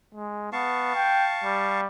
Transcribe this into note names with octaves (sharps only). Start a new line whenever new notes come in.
G#3
B3 F5 A5 C#6
G5
G3